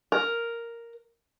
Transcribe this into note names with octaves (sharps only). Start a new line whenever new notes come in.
A#4